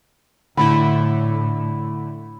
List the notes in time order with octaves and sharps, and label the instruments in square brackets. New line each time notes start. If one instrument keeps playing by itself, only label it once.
[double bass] A2 [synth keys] D3 A3 E4 [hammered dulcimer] B5